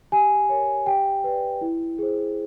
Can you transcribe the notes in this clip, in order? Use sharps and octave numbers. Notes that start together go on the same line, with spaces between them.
G4 G#5
A#4 C#5
G4 G5
B4 D5
E4
G#4 C5